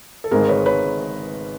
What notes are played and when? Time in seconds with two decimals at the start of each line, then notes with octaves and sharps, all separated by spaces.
0.24 A4
0.31 G#1 G#2 D#3 G#3 G#4 A#4
0.48 B4 C#5
0.65 B4 C#5